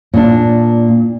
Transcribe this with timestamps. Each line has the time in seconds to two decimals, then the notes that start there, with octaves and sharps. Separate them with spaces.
0.14 A#2 D4